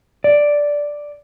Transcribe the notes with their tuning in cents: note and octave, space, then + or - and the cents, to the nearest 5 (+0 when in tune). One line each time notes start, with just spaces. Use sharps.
D5 +0